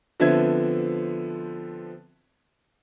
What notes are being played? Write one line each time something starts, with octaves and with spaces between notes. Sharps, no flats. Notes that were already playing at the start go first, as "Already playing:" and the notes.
D3 F3 B3 C4 E5 G#6